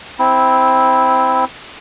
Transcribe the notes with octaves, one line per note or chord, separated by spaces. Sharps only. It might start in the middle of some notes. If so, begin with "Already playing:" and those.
C4 E4